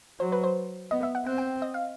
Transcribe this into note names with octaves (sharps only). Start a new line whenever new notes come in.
F#3 C5
B4
C5
B3 D#5
E5
F#5
C4 F#5
G5
D#5
F5